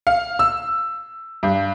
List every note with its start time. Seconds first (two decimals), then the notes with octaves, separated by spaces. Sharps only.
0.07 F5
0.39 E6
1.43 G2